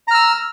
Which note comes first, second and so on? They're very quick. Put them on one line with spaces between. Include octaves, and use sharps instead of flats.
A#5 F6 E6